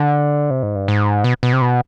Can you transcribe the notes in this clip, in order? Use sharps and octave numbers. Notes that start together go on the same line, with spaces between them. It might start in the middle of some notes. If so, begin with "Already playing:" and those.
Already playing: D3
C3
G#2
G2
G#2
B2
B2
C3
B2